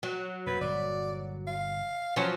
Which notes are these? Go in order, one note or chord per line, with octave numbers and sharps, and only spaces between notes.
F#3
F2 A#2 B4
G1 A#2 D5
F5
F3 F#3 C#4